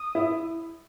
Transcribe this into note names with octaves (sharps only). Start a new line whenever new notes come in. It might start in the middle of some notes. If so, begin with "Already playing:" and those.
Already playing: D#6
E4